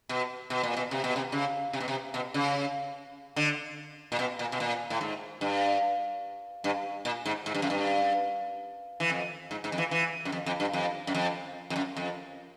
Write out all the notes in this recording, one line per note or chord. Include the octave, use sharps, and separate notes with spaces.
B2
B2
A#2
B2
C3
B2
C3
C#3
C3
B2
C3
B2
C#3
D3
A#2
B2
A#2
B2
A#2
A2
G#2
G2
G2
A#2
G#2
G#2
G2
F#2
G2
E3
F2
G#2
G#2
F2
E3
E3
F#2
F2
F2
G2
F2
F#2
F2
F2
F#2
F2